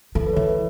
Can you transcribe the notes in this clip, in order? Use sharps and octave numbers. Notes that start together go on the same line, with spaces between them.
E3 A4
B4
C#5
E3 E5
B4